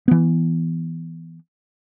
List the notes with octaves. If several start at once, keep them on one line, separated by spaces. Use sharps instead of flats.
E3 B3